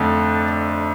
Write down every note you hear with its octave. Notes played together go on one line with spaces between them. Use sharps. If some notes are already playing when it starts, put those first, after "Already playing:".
Already playing: F2 D3 A3